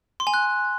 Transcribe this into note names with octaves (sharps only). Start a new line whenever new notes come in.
C6
G#5
F#6